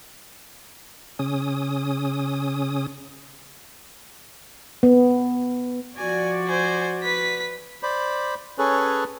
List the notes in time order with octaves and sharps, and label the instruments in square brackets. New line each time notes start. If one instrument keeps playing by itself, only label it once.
[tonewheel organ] C#3 C#4 D#6
[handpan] B3
[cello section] F3 F#4 D5 [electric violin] G#5
[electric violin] C5 G#5
B4 B6
[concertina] C5 D5 B5
C#4 G#4 A4 B4 C#5